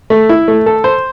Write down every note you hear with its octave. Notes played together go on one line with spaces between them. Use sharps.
A3
E4
A3
A4
C5